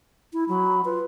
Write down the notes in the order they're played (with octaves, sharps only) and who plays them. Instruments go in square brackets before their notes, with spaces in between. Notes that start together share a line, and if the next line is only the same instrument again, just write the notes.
[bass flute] E4
[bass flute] F#3 [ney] B5
[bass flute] F4 [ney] B4